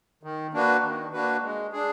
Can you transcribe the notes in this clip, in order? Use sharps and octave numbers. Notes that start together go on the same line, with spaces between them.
D#3
A#3 D4 F#4 B4
D#3
A#3 D4 F#4 B4
G#3
D4 G#4